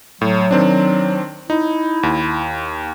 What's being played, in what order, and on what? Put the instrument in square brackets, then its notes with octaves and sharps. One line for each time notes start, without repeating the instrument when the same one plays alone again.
[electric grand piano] A2 [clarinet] F#3
[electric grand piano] D#3 C4 D4
[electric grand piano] D#4 [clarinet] E4
[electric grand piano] D#2